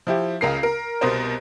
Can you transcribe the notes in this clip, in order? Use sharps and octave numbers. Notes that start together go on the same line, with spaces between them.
F3 E4 G4
C#2 C#3 A#4 A#5 C7
A#4
C2 B2 B3 A#4 C5